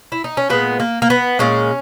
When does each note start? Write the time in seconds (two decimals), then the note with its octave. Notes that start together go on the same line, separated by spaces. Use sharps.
0.12 E4
0.24 D#4
0.37 C#4
0.50 A#2 G#3 B3
0.80 A#3
1.02 A#3
1.10 B3
1.39 A#2 G#3 C#4